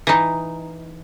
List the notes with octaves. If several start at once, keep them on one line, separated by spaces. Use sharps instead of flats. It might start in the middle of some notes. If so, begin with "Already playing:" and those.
E3 D#4